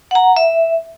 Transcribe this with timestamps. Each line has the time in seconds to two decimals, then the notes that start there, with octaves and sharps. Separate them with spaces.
0.11 F#5 A#5
0.36 E5